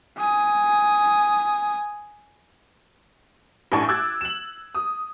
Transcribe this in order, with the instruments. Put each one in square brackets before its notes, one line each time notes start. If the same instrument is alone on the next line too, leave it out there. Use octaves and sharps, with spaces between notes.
[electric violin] G#5 D#6
[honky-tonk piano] A1 A2 D4 G#5 C#6
D6 E6 F#6 G#6 A6
E7 F#7
D#6